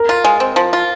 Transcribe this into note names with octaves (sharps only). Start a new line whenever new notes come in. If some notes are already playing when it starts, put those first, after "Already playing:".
Already playing: A#4
F4
G#3
C4
F3
F4